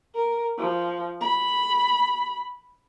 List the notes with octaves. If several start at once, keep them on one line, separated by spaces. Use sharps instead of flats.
A#4
F3
B5